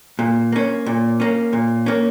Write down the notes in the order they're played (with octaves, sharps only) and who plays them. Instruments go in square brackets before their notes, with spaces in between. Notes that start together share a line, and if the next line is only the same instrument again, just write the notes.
[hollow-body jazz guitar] A#2
A#3 C#4
A#2
A#3 C#4
A#2
A#3 C#4